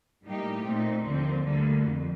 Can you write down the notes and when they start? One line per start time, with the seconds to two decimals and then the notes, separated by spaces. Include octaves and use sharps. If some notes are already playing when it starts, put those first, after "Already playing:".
0.24 A2 G3 A#3 D#4 G4
0.64 A#2 A3 C4 D#4
1.05 D#2 D3 F3 C4
1.44 D2 D3 G3 A#3
1.85 F2